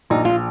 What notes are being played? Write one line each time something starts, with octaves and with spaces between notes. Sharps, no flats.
A#1 D#4
F4